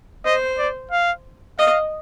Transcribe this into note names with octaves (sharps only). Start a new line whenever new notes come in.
C5 D#5
D5
F5
D#5 F5